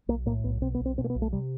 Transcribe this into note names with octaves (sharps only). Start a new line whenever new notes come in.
B1 A#3
A2 A#3
B1 B3
B2 C4
B3
B1
C4
B2 C4
A#3
B3
B1
A3
C3 G3